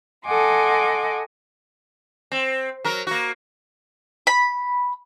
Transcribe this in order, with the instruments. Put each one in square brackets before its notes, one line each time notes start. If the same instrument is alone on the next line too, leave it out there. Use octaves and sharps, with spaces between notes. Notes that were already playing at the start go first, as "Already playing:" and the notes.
[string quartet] A4 D#5 F#5 G#5 C6 D6
[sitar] C4
F#3 A#4
A#3 F#4
[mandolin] B5